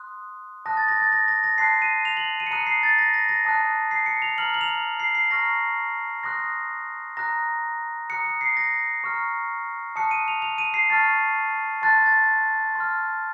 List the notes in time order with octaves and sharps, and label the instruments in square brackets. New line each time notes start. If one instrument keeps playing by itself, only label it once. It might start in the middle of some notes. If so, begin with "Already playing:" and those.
Already playing: [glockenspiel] C6 D#6 F#6
A5 D#6 F#6 A#6
A6
A#6
A6
A#6
A#6
A#6
A5 C6 F#6 C7
D#7
F7
F#7
D#7
C#7
A#5 D#6 F#6 D#7
C7
A6
A#6
A#6
A#6
A5 D#6 F#6
C7
C#7
F7
A#5 F6 F#7
F#7
F7
C7
C7
A#5 C#6 F6 A#6
C6 D#6 F#6 A#6
A#5 D#6 F#6 A#6
A#5 D#6 F#6 C#7
C#7
C7
A#6
A#5 C#6 F6
A5 D#6 F#6 C#7
D#7
F7
F7
D#7
C7
A5 C#6 F6 A6
A5 C6 F#6 A6
A6
C6
F6